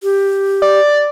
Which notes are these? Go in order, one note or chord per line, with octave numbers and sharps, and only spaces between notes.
G4
D5